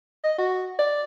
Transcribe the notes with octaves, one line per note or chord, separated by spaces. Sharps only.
D#5
F#4
D5